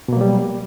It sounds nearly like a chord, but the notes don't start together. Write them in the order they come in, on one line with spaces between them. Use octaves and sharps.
B2 A#3 F#3 G3